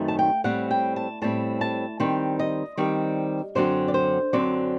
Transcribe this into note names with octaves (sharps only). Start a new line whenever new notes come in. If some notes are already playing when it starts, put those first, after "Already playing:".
Already playing: F#2 D#3 A3 C4 D#4
A5
G5
A2 G3 C4 F#5
G5
A5
A2 G3 C4 A5
A5
D#3 G3 C4 G5
D#5
D#3 G3 C4
F#2 D3 F#3 C4 C5
D5
C5
F#2 D3 F#3 C4 D5